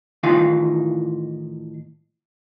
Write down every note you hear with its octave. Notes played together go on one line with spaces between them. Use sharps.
A2 D#3 E3 D#4 F4 F5